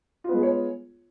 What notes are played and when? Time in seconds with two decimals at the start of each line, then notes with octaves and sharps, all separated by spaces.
0.24 F4
0.29 B3
0.34 G#3
0.38 G#4
0.43 C#5